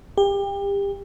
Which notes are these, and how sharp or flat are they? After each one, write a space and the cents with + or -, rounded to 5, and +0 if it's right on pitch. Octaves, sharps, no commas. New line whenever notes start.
G4 +30